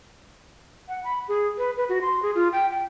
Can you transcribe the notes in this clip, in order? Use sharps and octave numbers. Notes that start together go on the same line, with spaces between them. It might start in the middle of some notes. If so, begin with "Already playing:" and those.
F#5
B5
G#4
B4
B4
F#4
C6
G#4
F4
G5
G5